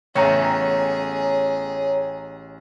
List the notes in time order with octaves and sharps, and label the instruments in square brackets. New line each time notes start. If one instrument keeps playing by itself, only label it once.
[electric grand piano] A1 [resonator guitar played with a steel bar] C#3 A3 B3 [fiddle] G#4 [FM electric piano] C#5 G5 A#5